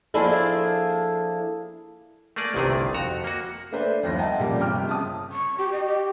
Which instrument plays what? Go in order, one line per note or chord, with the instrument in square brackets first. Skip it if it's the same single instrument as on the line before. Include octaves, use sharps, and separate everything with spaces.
[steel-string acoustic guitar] F3 A#3 D4 E4 G#4 A4
[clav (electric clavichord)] A3 A#3 G#4 D5
G1 C2 C3 D#3 A3 G#4
F2 F#4 A#5
A#3 F#4
[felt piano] A3 A#3 D4 B4 C5 E5
G1 D#2 F3 A#6
D#5 E5 F#5 G5 A5 A#5
A#2 C#3 F3 G3 A#3 G4
G1 C3 G5 D6 F6
C#3 A5 D#6
[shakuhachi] C#6
G4
D#5
G4